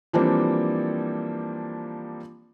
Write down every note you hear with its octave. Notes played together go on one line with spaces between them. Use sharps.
E3 F3 G3 A#3 C4 D4